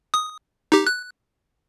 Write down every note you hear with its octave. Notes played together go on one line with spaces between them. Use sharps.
D#6
D#4 G4
F#6